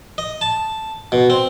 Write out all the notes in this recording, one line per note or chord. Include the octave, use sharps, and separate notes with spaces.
D#5
A5
B2
C4